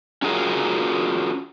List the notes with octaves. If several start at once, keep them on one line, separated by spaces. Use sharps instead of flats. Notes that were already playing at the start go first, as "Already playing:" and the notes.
C#4 F4 F#4 G#4 A#4